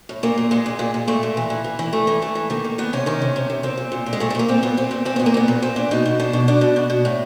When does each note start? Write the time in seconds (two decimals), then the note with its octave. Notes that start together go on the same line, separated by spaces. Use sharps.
0.09 A2
0.23 A#2 A#3
0.38 A#2
0.51 A#2 G#3
0.66 A#2
0.79 A#2
0.94 A#2
1.08 A#2 A3
1.23 A#2
1.37 E3
1.50 E3
1.64 E3
1.79 E3
1.93 E3 A3
2.07 E3
2.22 E3 A3
2.35 E3
2.50 D#3 A#3
2.64 D#3
2.78 D#3 B3
2.93 C3 C#4
3.06 D#3 C#4
3.22 C3
3.36 C3
3.50 C3
3.63 A#2 C4
3.78 A#2
3.92 A#2
4.06 A#2
4.13 G#3
4.20 A#2 A3
4.30 A3
4.35 A#2 A#3
4.49 A#2 C4
4.63 A#2 B3
4.77 A#2 C4
4.91 A#2
5.05 A#2 C4
5.16 A#2 B3
5.26 A#3
5.34 A#2 B3
5.48 A#2
5.62 A#2 C4
5.76 A#2 D4
5.91 B2 D#4
6.06 B2
6.20 B2 D4
6.33 B2
6.48 B2 D4
6.61 B2
6.76 B2
6.90 B2
7.05 A2